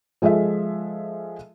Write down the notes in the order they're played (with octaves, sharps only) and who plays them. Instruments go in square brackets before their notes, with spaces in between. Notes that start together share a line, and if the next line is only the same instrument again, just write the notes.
[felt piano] F3 G#3 F4 A4 E5